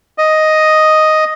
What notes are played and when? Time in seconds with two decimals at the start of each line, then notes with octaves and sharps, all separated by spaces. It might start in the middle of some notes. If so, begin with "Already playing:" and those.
0.18 D#5